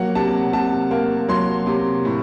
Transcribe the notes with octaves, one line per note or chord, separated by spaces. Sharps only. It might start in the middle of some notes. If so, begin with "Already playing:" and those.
Already playing: F#3 A#3 F#5
C3 A5
C3 A5
A#3
F#3 C6
C3
A2